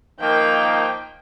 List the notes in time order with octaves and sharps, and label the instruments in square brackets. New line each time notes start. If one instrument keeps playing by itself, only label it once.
[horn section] D#3 F3 A#3 [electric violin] G5